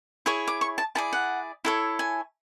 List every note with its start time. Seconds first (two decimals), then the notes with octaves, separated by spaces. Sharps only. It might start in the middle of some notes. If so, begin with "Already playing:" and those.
0.26 E4 G#4 C#5
0.47 D6
0.61 C#6
0.78 A5
0.95 E4 G#4 D5 A5
1.13 F#5
1.65 E4 A4 C#5
1.99 G#5